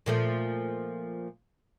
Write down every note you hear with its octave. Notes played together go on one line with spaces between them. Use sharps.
A#2 F3 A3